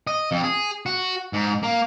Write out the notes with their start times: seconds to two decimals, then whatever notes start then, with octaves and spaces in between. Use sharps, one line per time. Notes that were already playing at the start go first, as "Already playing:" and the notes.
0.07 D#5
0.32 F2
0.44 G#4
0.86 F#4
1.33 G#2
1.63 A#3